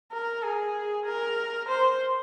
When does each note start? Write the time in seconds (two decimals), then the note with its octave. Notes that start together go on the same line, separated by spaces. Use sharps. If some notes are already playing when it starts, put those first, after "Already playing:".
0.12 A#4
0.43 G#4
1.06 A#4
1.68 C5